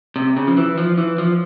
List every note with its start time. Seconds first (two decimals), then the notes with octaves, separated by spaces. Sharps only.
0.16 C3
0.37 C#3
0.47 F3
0.57 E3
0.78 F3
0.98 E3
1.18 F3